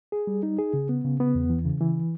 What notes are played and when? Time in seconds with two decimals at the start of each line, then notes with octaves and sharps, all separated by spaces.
0.12 G#4
0.27 G3
0.43 D#4
0.58 G#4
0.74 C#3
0.89 B3
1.04 C#3
1.20 B3
1.35 E2
1.50 E3
1.65 C#3
1.81 E3